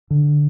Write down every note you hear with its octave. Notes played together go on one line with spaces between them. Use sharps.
D3